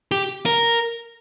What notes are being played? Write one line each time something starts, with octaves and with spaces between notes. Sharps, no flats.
G4
A#4